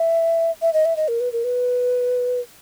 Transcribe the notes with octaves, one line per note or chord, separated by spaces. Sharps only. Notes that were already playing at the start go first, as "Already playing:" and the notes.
Already playing: E5
E5
D#5
E5
D#5
A#4
B4
A#4
B4